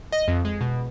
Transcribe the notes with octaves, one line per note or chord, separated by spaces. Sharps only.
D#5
F2
G#3
B2